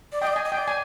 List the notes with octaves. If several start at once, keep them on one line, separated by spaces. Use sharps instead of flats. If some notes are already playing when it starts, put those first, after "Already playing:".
D5
D#5 G5
D5
D#5
G#5
D#5
G5
D5
G#5